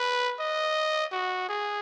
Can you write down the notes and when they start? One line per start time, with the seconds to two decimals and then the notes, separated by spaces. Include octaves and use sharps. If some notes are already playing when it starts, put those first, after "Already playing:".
Already playing: B4
0.39 D#5
1.12 F#4
1.49 G#4